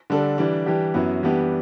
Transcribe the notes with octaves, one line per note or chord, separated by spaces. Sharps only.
D3 G3 D4 A4
E3 G3 D4
E3 G3 D4 G4
F#2 F#3 B3 E4
E3 G3 B3 D4 G4